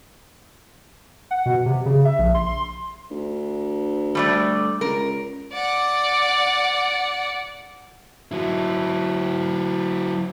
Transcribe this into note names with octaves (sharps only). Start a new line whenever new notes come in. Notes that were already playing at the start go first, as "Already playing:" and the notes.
F#5
B2
C3
C#3
E5
A#1
C6
C6
D2
G3 A3 D5
C#2 A#4
D5 F#5
F#3 E4